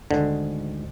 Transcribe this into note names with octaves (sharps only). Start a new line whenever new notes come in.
D2 G#2 D3 D#3